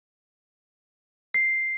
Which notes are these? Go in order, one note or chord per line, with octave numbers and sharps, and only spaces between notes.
C7